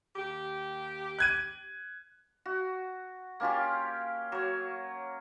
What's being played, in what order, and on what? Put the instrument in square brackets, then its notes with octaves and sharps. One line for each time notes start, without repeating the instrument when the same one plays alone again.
[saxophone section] D#2 G4
[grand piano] F#6 G#6 D#7
[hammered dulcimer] F#4
A#3 C#4 F4 G4
F#3 C#5